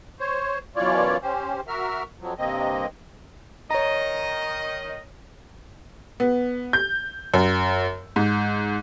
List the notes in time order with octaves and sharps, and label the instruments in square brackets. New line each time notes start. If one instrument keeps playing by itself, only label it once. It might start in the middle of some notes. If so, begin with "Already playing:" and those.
[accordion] C5 C#5
F#2 B2 E3 F4 C#5 D5
C#4 G4 C5
F#4 A#4 E5 F6
F2 F3 F#3
G2 C3 A#3 C4 D#5
[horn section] D#3 D#5 [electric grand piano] C#5 A#5
[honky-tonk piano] B3
G6
F#2
G#2